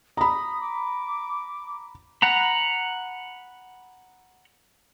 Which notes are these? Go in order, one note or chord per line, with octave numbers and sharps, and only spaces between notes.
A#5 B5 D#6
D6
F#5 A#5 B5